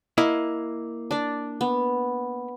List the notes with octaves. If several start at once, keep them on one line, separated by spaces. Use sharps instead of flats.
A#3 E4 D#5
D4 D5
B3